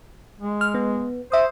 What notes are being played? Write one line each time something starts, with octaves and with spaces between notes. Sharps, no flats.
G#3
F6
B3
C5 E5 D#6